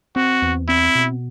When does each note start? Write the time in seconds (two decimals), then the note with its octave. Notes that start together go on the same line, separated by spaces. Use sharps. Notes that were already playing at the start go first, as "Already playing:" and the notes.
0.16 C4 F#4
0.42 E2
0.69 C4 E4
0.95 B2